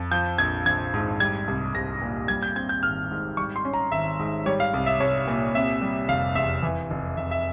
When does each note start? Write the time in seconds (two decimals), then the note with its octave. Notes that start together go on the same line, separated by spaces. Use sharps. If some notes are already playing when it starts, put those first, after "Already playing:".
Already playing: F2
0.12 F3 G6
0.38 A#1 G#6
0.66 A#1 G#6
0.94 G#2
1.20 G3 G#6
1.48 C2
1.75 C2 A#6
2.02 A#2
2.28 G3 G#6
2.43 G6
2.55 C4 G#6
2.69 G6
2.83 G#1 F6
3.11 G#2
3.37 G3 C#6
3.56 C6
3.65 C#4
3.74 A#5
3.91 G#1 E5
4.19 G#2
4.46 G3 C#5
4.60 F5
4.74 C2
4.86 E5
5.00 C2 C#5
5.28 A#2
5.55 C3 E5
5.82 G3
6.08 F1 F5
6.35 E2 E5
6.63 E3
6.90 F1
7.17 F1 E5
7.31 E5